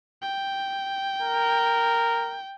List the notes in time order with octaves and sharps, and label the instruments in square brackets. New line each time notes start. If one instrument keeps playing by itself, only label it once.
[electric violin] G5
[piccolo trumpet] A#4